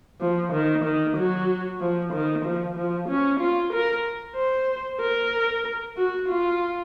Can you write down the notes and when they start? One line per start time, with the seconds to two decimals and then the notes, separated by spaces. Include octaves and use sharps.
0.21 F3
0.53 D#3
0.84 D#3
1.17 F#3
1.81 F3
2.13 D#3
2.45 F3
2.76 F3
3.09 C#4
3.40 F4
3.73 A#4
4.36 C5
5.01 A#4
5.97 F#4
6.29 F4